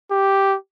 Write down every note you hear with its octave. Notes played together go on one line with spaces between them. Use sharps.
G4